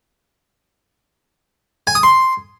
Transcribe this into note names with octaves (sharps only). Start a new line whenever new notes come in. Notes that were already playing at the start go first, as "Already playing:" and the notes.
G#5
D#6
C6